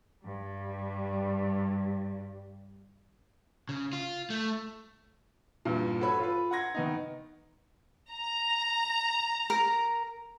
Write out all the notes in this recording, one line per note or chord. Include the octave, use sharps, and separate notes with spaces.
G2 G3
C#3
F4
A3
E2 G2 A#2
F#4 A4 B4 C#5 B5
F4 B4
F#5 A#5 C6 G#6 A#6
D#3 B3 D#4
A#5
A#4